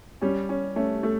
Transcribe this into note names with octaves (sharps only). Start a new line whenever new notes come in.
G3 C#4
C#4
A3 C#4
A3